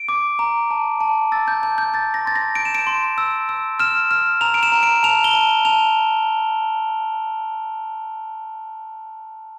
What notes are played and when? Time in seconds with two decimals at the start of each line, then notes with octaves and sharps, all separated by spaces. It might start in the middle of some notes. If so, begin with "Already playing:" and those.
Already playing: D7
0.09 D6
0.39 A#5
0.71 A5
1.01 A5
1.32 E6 A6
1.48 G6
1.63 A5 G6
1.78 G6
1.94 G6 A6
2.14 A#6
2.25 C6 A6
2.36 A#6
2.55 G6 D7
2.65 E7
2.75 D7
2.87 C6
3.18 E6
3.49 E6
3.80 F6 E7
4.11 F6
4.41 A#5 F7
4.54 D7
4.63 E7
4.72 A#5
4.83 D7
5.03 A5 F7
5.24 G7
5.34 A5
5.65 A5 F7